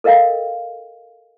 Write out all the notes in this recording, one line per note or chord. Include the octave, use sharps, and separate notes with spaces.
A4 A#4 D#5 F5 G5